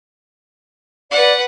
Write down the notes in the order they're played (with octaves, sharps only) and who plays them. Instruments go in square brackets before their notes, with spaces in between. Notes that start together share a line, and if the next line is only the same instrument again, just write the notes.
[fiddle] B4 F#5 [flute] D5